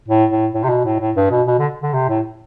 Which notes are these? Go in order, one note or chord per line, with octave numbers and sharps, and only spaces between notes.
A2
A2
A2
C3
B2
A2
A2
G2
B2
B2
D3
D3
C3
A2